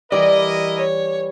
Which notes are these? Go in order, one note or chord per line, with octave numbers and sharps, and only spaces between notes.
E3 G3 E4 A#4 D5 D#5
C#5